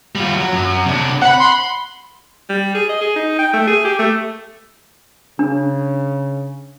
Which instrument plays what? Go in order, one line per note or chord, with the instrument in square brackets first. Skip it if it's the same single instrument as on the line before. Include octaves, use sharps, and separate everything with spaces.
[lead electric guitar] G3 F4
F#3
F#2
C3 D4
[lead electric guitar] C5 B5 [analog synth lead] F#5
[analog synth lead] C6
[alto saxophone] G3
G#4
D#5
G#4
D#4
G5
A3
G#4
G4
A3
[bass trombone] C#3 [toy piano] D4